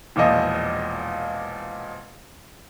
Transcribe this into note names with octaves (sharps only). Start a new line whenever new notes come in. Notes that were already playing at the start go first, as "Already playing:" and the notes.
E1 E2 A#2 F3 D#5